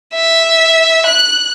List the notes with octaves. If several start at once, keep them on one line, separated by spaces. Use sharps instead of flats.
E5
F#6